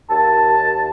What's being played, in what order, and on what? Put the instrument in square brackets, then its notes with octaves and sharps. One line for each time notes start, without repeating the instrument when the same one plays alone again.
[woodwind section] D#2 A5